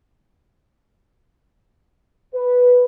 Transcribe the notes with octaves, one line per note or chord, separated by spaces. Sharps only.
B4